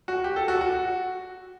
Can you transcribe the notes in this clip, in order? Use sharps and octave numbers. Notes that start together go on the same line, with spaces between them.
F#4
G4
A4
F#4
F#4